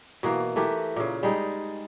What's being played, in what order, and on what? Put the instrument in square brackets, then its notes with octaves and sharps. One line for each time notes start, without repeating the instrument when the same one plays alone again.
[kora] B2 E3 A#3
E3 A3 G4 A#4
A#2 C#3
G3 G#3 D#4